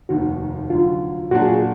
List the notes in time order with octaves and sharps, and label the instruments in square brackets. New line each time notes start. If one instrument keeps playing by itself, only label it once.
[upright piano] F1 D#2 D#3 [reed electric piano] F#4
[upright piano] D2 D3 F#3 [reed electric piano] F4
[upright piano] A#2 F#3 D4 [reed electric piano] F#4
[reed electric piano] G#4
F#4